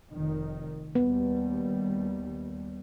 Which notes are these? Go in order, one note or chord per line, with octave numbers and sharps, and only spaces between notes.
F1 D#3
D#2 G3 B3